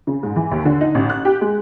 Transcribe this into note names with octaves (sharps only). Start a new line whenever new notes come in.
C#3
G#2
E3
D#2
D3
D#4
A1
F#6
G4
G#3